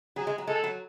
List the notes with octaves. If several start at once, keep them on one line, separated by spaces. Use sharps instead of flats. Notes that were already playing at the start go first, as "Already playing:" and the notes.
F#3 G#4
G#3
F#3
G#3 A4
F#3